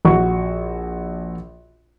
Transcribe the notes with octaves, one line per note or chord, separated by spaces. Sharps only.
A#1 F#4 C#6